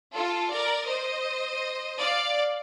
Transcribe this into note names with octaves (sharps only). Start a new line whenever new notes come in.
F4 A4
A#4 D5
C5 D#5
D5 F5